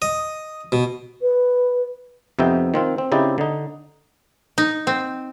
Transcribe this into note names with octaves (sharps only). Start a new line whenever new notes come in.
D#5
B2
B4
F2 C3 B3 D#4 E5 G5
D#3 C4 F4
C4
C#3 C4 D#4 E4 G4 D5
D3 D#4
D#4
C4